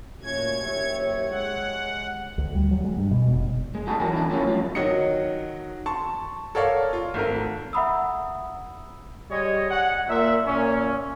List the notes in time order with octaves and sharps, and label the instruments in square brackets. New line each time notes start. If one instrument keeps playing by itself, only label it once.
[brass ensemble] A#2 A3 C#4 [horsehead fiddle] F#4 C#5 [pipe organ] G#6
[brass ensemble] F#1 A#2 E5 [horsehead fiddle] G4 C#5
[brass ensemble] G#3 [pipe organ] F#5
[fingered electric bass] D2
G3
F#3
G#3
G2
B2
F1
[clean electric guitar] G#3
D#4 F#4 G#4 A4
E2 F#3 A#4 G#5
E3 D4
A2 F3 F#3 A#3 B3 C#4
G2 F3
[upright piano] D#3 F#3 F#4 D#5 C#7
A5 C6 C#6
A4 A#4 C#5 D5 F5 C#6
F4
G#1 A3 A#4
[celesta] E5 F#5 A#5 B5 D#6 E6
[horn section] G3 G#3 C#5 D#5
F#5
A#2 E5
A#2 C#4